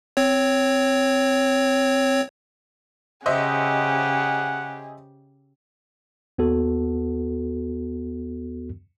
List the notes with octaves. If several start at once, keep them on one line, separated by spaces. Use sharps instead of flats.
C4 C#5
C#3 G4 G#4 C5 D#5 E5 F#5
D#2 B3 F#4 A4